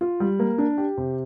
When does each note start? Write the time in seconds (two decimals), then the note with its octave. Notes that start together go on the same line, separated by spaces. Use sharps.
0.01 F4
0.20 G3
0.39 A#3
0.58 D4
0.78 G4
0.97 C3